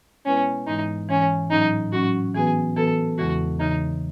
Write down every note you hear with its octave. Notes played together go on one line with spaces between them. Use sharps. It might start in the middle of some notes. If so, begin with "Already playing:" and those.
B2 G#3 B3 C#4 E4 B4
G#2 E3 G#3 D#4
G#2 E3 G#3 C#4
A2 F#3 C#4 D#4
A2 F#3 C#4 F#4
E3 B3 F#4 G#4 B4
E3 B3 F#4 A4 B4
E2 C#3 E3 G#3 F#4
E2 C#3 E3 G#3 D#4